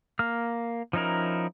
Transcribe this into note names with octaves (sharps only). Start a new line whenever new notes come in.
A#3 F6
F3 C#4 D#4 E4 A#4